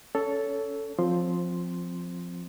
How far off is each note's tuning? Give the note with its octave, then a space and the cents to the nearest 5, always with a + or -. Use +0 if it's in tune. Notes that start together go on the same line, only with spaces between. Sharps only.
C#4 +20 A4 +0 C#5 +25
F3 +10 C4 +0 C6 +0